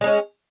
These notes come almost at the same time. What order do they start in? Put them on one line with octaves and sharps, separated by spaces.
G#3 D#4 C#4